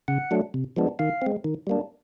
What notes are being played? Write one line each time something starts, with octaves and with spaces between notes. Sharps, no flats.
C#3 F#5
F#3 A3 D4
C3
F3 G#3 B3 D4
D#3 F5
G#3 C4
D#3
G3 A#3 D4